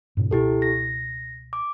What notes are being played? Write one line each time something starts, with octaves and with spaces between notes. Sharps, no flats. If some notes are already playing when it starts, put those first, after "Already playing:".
G2 A#2 C#3
C#2 B2 E4 G4 A4
A#6
D6